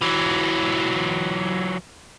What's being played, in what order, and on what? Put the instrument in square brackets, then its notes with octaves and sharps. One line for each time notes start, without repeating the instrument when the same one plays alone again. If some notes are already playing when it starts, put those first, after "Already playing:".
[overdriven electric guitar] E3 F#3